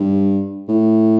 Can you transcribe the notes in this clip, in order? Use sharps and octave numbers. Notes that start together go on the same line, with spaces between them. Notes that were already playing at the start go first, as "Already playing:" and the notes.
Already playing: G2
A2